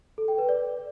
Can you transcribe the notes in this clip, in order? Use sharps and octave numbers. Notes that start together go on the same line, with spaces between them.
A4
G5
B4
D5